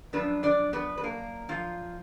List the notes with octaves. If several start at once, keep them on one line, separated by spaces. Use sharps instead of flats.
F#2 F3 B3 D4 B4
D4 D5
B3 B4
B4
A#3 A#4
F3 F4